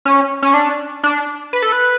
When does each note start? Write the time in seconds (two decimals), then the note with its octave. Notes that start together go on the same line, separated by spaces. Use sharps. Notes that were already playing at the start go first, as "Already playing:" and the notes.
0.05 C#4
0.42 C#4
0.54 D4
1.03 D4
1.53 B4
1.62 A4
1.72 B4